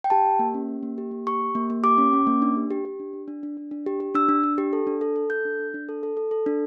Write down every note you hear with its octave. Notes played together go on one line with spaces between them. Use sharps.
G5
G4 A5
G4
A#3
C#4
G4
A#3
G4
A#3
G4 C#6
G4
A#3
A#3
G4 D6
C#4
C#4
A#3
D4
G4
G4
G4
D4
D4
D4
D4
D4
D4
G4
G4
D4 E6
D4
D4
G4
A4
D4
A4
A4
A4 G6
D4
D4
D4
A4
A4
A4
A4
D4